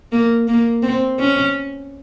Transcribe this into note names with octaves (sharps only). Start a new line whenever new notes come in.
A#3
A#3
C4
C#4